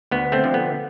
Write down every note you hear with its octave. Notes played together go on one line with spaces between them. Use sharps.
D2 B3
A3 C4
D3 F3
B3